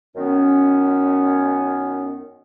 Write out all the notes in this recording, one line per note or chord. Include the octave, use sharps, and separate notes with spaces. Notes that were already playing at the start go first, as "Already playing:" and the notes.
F#2 D#3 B3 C#4